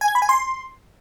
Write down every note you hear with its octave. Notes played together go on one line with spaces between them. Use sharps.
G#5
G#6
B5
G#5
C6